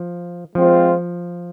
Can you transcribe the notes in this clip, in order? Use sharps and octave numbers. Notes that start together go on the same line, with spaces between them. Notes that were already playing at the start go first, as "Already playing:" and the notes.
Already playing: F3
F3 G#3 C4 F4 C5